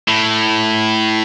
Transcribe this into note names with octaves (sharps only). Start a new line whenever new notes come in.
A2